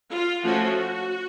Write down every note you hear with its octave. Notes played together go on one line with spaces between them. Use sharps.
F4
F3 A3 C#4 F#4